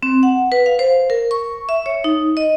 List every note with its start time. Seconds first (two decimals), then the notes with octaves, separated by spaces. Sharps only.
0.03 C4
0.23 F#5
0.52 B4
0.66 F5
0.79 C5
1.10 A#4
1.31 C#6
1.69 E5
1.86 C#5
2.04 D#4
2.37 D#5